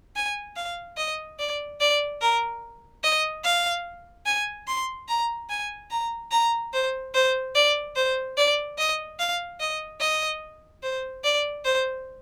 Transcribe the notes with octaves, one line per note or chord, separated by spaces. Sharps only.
G#5
F5
D#5
D5
D5
A#4
D#5
F5
G#5
C6
A#5
G#5
A#5
A#5
C5
C5
D5
C5
D5
D#5
F5
D#5
D#5
C5
D5
C5